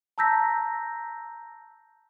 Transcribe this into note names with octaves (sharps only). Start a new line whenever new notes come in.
A5 A#5 E6 G6 A#6 B6